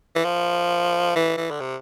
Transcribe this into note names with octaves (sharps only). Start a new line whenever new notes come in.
E3
F3
E3
E3
D3
C3